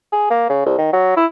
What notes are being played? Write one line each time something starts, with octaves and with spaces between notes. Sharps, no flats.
G#4
A#3
C#3
C2
D#3
F#3
E4